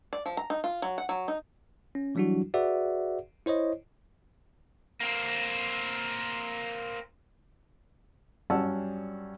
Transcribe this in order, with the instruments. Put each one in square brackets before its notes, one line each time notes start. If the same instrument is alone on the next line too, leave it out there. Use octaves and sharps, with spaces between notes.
[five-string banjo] D5
F3
A#5
D#4
F4
F#3
F#5
F#3
D#4
[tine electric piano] C#4
E3 F#3 G3 D4 E4 F#4
F#4 G#4 B4 D5 E5 F#5
E4 C5 C#5 D#5
[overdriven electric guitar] A#3 C4
[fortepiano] G2 F#3 C#4 F#5 A5 E6